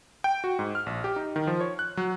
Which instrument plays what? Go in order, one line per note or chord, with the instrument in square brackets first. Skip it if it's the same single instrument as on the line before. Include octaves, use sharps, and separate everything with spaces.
[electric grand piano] G5
F#4
G#2
F6
A#1
G4
D#4
D#3
F3
C#5
F#6
F#3